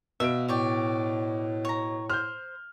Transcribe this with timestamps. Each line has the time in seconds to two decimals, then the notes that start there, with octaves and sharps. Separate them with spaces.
0.20 B2 E5 F5 D7
0.48 A2 C#5 D5 G5
1.65 C#5 A#5
2.10 C5 F6 G6